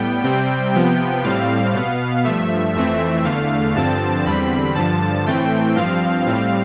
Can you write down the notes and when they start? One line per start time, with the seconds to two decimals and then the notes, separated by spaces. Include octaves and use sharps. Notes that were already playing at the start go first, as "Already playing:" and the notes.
Already playing: A2 G3 B3 G5
0.24 C3 G3 C4 G5
0.73 C3 F3 B3
1.24 A2 G3 C4 F5
1.74 B2 B3
2.24 G2 F3 A3 E5
2.75 F2 E3 A3 C4 E5
3.25 E2 D3 A3 F5
3.75 G2 D3 F3 C4 A5
4.25 E2 D3 G3 C4 B5
4.75 G2 D3 F3 A5
5.26 A2 E3 A3 C4 G5
5.75 G2 F3 C4 F5
6.26 A2 G3 C4